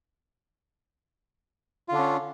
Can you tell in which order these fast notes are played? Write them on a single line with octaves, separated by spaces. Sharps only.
F4 D3 D4 C#4